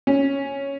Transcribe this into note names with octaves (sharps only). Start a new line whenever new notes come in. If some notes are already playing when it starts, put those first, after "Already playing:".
C#4